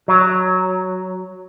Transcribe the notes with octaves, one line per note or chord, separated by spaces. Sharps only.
F#3